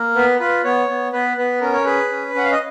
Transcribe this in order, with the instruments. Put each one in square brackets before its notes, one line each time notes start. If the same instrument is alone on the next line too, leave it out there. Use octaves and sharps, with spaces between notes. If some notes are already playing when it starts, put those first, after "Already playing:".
Already playing: [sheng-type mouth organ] A#3
B3 B4
F4 B4
B3 C#5
B3
B3 B4
B3 B4
C#4 A#4
C#5
G#4 B4
C#4
C#4 F#5
F5
D#5